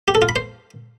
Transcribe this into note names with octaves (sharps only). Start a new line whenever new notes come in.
G4
A4
F4
B5
C5